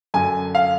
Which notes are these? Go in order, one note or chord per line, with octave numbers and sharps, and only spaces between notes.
F#2 D3 G#5
F5